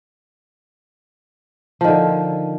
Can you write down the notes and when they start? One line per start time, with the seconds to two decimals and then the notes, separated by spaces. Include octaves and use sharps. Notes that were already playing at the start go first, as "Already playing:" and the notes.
1.81 F3
1.84 D#3
1.88 D3